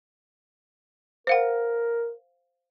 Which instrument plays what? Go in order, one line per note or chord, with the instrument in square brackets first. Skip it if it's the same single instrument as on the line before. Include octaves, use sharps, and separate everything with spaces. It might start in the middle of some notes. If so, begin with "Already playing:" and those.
[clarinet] A#4 [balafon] C5 F5 F#5